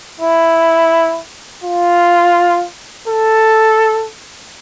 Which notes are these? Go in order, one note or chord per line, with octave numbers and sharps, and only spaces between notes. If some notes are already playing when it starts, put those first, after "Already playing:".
E4
F4
A4